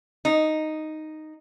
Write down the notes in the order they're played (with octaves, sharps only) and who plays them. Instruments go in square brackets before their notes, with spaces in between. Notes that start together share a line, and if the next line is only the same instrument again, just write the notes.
[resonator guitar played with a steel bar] D#4